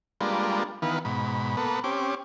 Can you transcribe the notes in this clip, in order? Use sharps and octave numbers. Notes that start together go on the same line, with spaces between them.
G3 G#3 A#3 D4 F4 B4
D#3 E3 B3 B4 F5
G#2 B2 B5
A#3 B3 A4 B4
C4 C#4 G4 D6